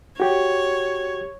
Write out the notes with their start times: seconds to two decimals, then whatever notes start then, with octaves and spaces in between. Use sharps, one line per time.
0.20 F#4 G4 C#5